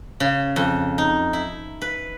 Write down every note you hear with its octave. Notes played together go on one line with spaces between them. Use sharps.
C#3
F2
D#4
E4
B4